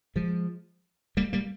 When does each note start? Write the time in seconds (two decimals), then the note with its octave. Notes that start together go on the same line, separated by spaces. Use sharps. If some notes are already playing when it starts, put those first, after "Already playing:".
0.16 F3 G#3
1.17 G3 A#3
1.33 G3 A#3